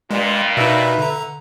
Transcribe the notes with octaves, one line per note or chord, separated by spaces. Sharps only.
G2 A#2 G#3
B2 D#4 B4 E5
D3 A#5